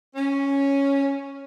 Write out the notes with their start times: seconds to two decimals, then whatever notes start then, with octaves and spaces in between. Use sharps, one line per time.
0.16 C#4